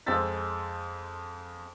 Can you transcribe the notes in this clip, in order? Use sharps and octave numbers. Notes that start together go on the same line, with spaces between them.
F2 G#3 C5 E6 A6 B6